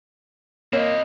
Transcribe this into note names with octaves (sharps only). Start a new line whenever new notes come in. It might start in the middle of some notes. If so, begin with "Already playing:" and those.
A#3 C4 C#5 D#5